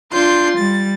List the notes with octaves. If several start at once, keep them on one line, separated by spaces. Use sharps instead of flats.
D4 F4 C6 G6
G3 A6